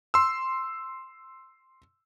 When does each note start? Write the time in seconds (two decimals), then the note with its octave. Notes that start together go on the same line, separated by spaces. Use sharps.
0.14 C6 E6